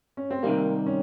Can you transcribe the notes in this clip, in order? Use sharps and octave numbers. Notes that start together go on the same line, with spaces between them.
C#4
C4
C3 D#3 G3 A#3
C#4